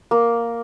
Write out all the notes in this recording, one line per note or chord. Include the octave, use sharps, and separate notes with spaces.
A#3